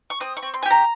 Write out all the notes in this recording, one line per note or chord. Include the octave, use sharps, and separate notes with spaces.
C#6
C4 D#6
C#6
C4
C6
G#5
G4
A#5